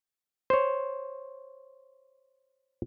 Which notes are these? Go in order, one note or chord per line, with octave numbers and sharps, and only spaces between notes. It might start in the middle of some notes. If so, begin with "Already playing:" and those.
C5 C#5